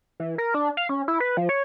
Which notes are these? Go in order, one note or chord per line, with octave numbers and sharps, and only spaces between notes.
E3
A#4
D4
F5
C#4
E4
B4
F3
C#5